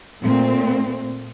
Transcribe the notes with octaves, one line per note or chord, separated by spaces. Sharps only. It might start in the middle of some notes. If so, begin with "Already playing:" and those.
A#2 A3 C4